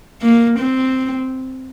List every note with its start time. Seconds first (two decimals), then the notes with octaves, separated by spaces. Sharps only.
0.22 A#3
0.59 C4